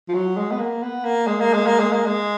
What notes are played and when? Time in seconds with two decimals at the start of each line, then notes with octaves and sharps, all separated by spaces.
0.08 F3
0.14 F#3
0.37 G#3
0.52 B3
0.59 A#3
0.82 B3
1.04 A#3
1.27 G#3
1.40 A#3
1.54 G#3
1.66 A#3
1.79 G#3
1.93 A#3
2.06 G#3